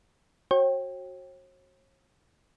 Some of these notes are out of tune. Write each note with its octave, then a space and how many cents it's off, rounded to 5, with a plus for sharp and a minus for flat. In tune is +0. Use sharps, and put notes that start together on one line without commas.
F#4 +0 C#5 -45 G5 +0